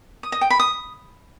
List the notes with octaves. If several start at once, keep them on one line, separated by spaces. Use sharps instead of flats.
D#6
D#5
G5
B5
D#6